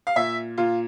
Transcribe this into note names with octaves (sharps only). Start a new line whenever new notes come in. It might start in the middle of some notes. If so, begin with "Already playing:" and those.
F5
A#2 E5
A#2 F4